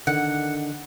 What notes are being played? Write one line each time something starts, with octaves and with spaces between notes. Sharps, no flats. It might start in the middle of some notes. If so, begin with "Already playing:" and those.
D3 D#3 F#5